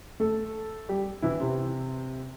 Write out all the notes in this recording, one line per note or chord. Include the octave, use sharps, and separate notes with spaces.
A3 A4
G3 G4
E3 E4
C3 C4